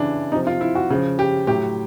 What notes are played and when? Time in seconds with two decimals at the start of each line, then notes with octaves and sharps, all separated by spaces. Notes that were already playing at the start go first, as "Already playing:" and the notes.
Already playing: C#3 E3 D4
0.32 C3 F3 D#4
0.47 F4
0.61 E4
0.75 F#4
0.90 C#3 F3
1.19 G4
1.47 A2 F#3 G4